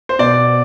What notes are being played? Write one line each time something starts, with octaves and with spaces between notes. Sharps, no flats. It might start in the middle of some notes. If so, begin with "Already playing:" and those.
C5
B2 D5